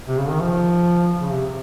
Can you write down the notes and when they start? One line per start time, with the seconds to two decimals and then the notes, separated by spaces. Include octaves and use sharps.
0.08 C3
0.18 C#3
0.29 D#3
0.41 F3
1.21 C#3
1.32 C3